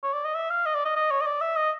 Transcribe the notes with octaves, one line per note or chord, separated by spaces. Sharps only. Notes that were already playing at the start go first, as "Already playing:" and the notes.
C#5
D5
D#5
E5
F5
D#5
D5
D#5
D#5
C#5
D#5
D5
E5
D#5